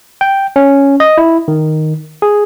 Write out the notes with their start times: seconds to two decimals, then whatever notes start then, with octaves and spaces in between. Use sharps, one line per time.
0.21 G5
0.56 C#4
1.00 D#5
1.18 E4
1.48 D#3
2.22 G#4